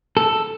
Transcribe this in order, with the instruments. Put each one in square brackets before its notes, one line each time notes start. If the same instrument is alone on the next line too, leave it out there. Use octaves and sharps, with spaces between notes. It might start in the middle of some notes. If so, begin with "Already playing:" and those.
[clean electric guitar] A4